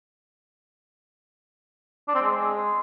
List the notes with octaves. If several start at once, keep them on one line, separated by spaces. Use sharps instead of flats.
D4
C4
G#3